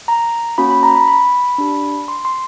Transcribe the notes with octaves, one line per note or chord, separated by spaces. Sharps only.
A#5
A#3 C#4 F#4 B5
B5
A#5
B5
B5
D4 G4
C6
C6